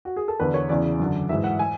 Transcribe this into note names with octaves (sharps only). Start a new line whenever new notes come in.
F#4
G#4
A4
E2 D3 B4
C#5
E2 C#3 E3 D5
F#2 D3
G#2 E3 E5
F#5
G#5